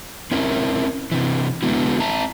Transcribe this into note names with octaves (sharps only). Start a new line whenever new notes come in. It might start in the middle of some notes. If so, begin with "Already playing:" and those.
C4 C#4 E4 A#4
C3 E3
D3 G#3 B3 E4 F#4
C4 E5 A5 A#5